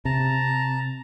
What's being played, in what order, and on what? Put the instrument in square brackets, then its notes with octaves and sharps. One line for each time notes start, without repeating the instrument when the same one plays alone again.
[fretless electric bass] C3 [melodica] A5 A#5